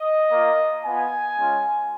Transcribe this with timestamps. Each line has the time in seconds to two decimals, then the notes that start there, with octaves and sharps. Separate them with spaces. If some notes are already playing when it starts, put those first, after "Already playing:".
Already playing: D#5
0.31 A#3 F4
0.84 B3 F4 G#5
1.38 G#3 C#4 F4